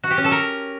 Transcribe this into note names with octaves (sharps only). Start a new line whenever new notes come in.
F#4
G4
C#4
A4
A#4